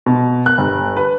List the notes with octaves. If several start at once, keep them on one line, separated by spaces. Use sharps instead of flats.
B2
F#6
G1
B4